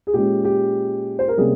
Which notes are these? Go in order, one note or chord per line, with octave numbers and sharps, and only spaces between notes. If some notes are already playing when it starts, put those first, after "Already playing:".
G#4
A#2 G#3 C#4 G4
G4
C5
A#4
C3 G3 A#3 C#4 G#4